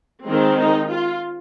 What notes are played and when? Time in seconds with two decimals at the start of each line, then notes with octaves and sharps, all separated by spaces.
0.25 D#3 G#3 C4
0.57 D#4
0.90 F4